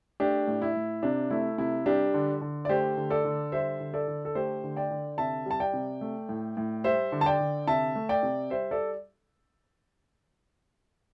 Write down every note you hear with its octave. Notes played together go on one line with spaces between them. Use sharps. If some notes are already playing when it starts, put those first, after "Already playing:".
A3 D4 G4
A2
E4
A2
C3 D4
A3 E4
C3 E4
G3 D4 G4
D3
D3
D5
A3 G4 C5
D3
A4 D5
D3
G3 C5 E5
D3
A4 D5
D3
A4
A3 G4 C5
D3
D5 G5
D3
C3 E5 A5
G3 A5
D5 G5
C3
A3
A2
A2
G3 C5 E5
D3
A5
D5 G5
D3
C3 E5 A5
A3
D5 G5
C3
G3 C5 E5
A4 D5